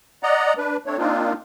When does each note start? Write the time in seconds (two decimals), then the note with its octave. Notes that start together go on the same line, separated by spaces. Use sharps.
0.23 D5 D#5 F#5 A#5
0.58 D4 B4
0.86 A3 C4 D4 C#5
0.98 A#3 C4 D4 D#4 F4